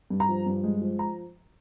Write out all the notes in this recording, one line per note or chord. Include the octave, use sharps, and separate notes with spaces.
G2
A#5
F3
G2
G#3
F3
A#5